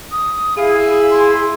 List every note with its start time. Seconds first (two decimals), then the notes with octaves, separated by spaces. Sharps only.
0.12 D#6
0.57 E4 G#4 F5
1.10 C6